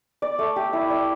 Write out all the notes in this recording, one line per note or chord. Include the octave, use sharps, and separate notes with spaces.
D5
A3
G4
E4
D5